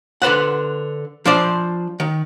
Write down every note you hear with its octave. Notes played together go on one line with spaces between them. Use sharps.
D3 B4 C5 F#5
F3 D4 C5 D5
D#3